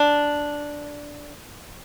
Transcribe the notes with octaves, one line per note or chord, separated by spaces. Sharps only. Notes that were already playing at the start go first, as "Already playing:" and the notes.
Already playing: D4